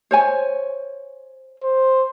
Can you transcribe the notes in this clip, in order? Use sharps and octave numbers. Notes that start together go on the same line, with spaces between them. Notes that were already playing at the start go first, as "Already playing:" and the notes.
C5 C#5 G#5
C5